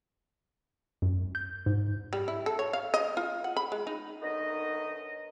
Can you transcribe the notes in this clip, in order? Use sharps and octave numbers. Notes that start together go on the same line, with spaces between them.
F#2
G6
G#2
G3
E4
A4
C#5
F5
D#5
F4
F#5
B5
G#3
D#4
F#2 B2 D3 D#3 D#4 D#5